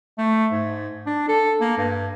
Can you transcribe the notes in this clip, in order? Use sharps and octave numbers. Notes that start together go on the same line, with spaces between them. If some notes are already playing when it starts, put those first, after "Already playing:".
A3
G#2
D4
A4
A#3
G2